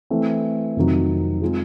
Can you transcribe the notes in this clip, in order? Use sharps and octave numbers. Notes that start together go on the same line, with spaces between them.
E3 A3 C4
F2 C3 D#3 F#3
G#3 C4 F4 G#4